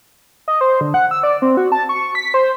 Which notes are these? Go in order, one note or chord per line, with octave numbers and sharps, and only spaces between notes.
D#5
C5
D3
F#5
E6
D5
C4
F#4
A5
C#6
B6
C5